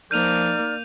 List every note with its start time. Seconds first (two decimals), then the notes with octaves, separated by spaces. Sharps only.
0.11 F3 A#3 D#4 D5 F6 G6 D#7 F7